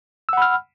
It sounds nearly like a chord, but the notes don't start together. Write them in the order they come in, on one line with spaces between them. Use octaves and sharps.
E6 F#5 B5 F6